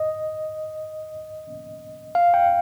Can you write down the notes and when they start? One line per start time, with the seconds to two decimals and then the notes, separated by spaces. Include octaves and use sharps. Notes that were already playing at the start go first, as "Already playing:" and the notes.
Already playing: D#5
2.15 F5
2.34 G5